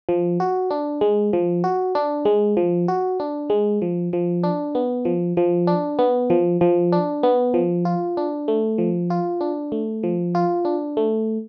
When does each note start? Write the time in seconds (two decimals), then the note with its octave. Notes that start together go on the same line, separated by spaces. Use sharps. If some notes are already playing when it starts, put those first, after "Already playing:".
0.09 F3
0.40 F#4
0.71 D4
1.01 G#3
1.33 F3
1.64 F#4
1.95 D4
2.25 G#3
2.57 F3
2.88 F#4
3.20 D4
3.50 G#3
3.82 F3
4.13 F3
4.44 D4
4.75 B3
5.05 F3
5.37 F3
5.67 D4
5.99 B3
6.30 F3
6.61 F3
6.92 D4
7.23 B3
7.54 F3
7.85 F4
8.17 D4
8.48 A3
8.78 F3
9.10 F4
9.41 D4
9.72 A3
10.03 F3
10.35 F4
10.65 D4
10.97 A3